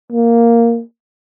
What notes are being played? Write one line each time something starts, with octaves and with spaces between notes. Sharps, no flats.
A#3